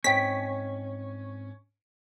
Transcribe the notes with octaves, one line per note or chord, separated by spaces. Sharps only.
G#2 C4 C#4 C5 D#5 G5 B6